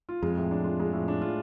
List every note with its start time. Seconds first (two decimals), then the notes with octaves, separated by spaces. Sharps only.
0.09 F4
0.22 F2 G#3
0.37 A2
0.51 D4
0.64 F4
0.80 G#3
0.93 A2
1.08 D4
1.22 F4